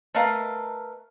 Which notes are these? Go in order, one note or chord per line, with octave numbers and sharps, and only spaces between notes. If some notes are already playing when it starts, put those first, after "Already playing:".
A3 A#4 B4 D#5 F5 A#5